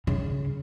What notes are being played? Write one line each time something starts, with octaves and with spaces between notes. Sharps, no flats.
C#3